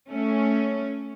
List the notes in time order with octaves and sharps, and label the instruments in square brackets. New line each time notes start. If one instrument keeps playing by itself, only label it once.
[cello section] A3 C#4